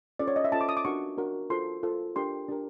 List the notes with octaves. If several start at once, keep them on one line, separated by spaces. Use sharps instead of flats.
C#4 F4 A4 C5 D5
C#5
D#5
E5
C#4 F4 A4 C5 A5
D6
D#6
D6
D4 F#4 A#4 C#6
D4 F#4 A#4
F4 A4 C5 C6
F4 A4 C5
D4 G4 A#4 C6
D4 G4 A#4